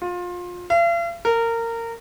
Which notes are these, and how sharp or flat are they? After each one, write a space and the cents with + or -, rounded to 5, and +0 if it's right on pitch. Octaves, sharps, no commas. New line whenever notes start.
F4 +25
F5 -45
A#4 -20